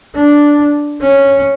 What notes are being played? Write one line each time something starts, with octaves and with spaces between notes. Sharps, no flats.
D4
C#4